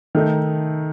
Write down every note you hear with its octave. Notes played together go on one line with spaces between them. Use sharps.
D#3 A3 D#4